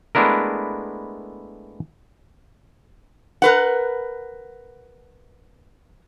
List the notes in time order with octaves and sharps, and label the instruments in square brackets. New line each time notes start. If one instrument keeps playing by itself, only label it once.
[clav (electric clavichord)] G#3 A3 B3 D4 E4 A#4
[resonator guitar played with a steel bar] A#4 B4 F#5